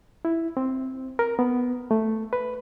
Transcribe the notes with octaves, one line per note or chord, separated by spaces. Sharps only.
E4
C4
A#4
B3
A3
B4